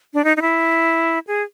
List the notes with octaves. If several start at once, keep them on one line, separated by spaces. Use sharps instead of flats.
D4
D#4
D#4
E4
G#4